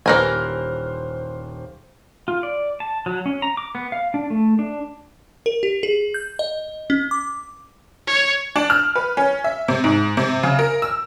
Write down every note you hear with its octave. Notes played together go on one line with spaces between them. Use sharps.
D#1 E3 A#4 C5 G#5 F6
F4
D5
A5
F#3
C#4
A#5
D6
B3
F5
D4
A3
D4
A#4
G4
G#4
G6
D#5
C#4
D6
C#5
D4
F6
B4
C#4
E5
C3
G#2
C3
C#3
A#4
E6